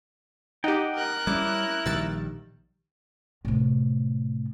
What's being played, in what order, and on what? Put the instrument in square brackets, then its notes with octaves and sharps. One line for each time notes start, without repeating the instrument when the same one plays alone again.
[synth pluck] D#4 G4 [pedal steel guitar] D#5 F#5 G5
[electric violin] A#4 F#6
[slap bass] G3 B3 C#4 [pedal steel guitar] E4 [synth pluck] D6
[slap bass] A#1 D#3 G3 [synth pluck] E6 A6
[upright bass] A2 C3